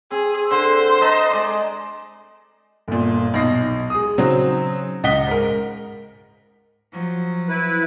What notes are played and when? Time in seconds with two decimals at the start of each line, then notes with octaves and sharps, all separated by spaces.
0.11 C4 G#4
0.51 D3 C5 C6
1.01 D#5 A5 A#5
1.30 G#3 D5
2.88 G1 A#2
3.34 B1 D#4 A#6 C7
3.90 G#3 D#6
4.18 C#3 F#3 C4 D#4
5.03 C#2 D#5 F#5 B6 G7
5.27 G#2 A#4
6.93 F3 F#3
7.49 E4 B4